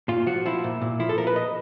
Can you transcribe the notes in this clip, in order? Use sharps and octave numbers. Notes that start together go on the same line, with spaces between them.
A#2 F4
F3 F#4
F3 E4
A#2
A#2
F3 E4
A4
F3 A#4
B4
D#5